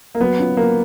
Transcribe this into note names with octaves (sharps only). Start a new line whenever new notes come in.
A#3
F#3 B3
C#4 F4
F#3 A#3